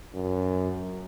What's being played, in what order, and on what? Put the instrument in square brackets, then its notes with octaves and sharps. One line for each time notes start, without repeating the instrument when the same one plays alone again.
[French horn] F#2